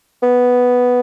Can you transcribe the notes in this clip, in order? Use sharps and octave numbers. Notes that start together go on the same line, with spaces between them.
B3